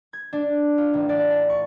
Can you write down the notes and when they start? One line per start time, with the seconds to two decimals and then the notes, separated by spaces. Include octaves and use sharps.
0.13 G#6
0.33 D4
0.78 F4
0.94 A1
1.09 D5
1.30 A5
1.50 C#6